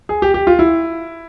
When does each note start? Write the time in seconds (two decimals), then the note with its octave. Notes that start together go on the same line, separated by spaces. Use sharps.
0.09 G#4
0.22 G4
0.34 G4
0.47 F4
0.59 E4